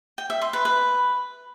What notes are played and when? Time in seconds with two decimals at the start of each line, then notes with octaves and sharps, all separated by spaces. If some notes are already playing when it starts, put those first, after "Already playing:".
0.18 G5
0.30 E5
0.42 C6
0.53 B4
0.65 B4